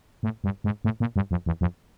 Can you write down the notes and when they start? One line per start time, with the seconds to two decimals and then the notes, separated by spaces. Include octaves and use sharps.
0.23 A2
0.44 G2
0.64 G#2
0.85 A2
1.00 A#2
1.16 G2
1.31 F2
1.46 E2
1.61 F2